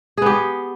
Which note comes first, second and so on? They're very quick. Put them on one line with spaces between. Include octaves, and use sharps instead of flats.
G#4 B3 G4